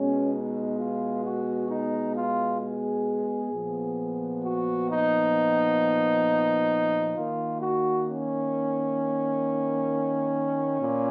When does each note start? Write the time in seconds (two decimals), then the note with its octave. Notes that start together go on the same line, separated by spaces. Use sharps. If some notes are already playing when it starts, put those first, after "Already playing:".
Already playing: B2 G#3 B3 C#4
0.33 D#4
0.78 F4
1.24 F#4
1.70 D#4
2.15 F4
2.61 G#4
3.52 A#2 F3 B3
4.43 F#4
4.88 D#4
7.16 D#3 A#3 F4
7.61 F#4
8.07 C#4
10.80 A#2